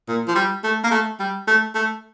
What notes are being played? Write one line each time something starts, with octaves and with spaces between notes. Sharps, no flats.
A#2
F3
G3
A3
A#3
A3
G3
A3
A3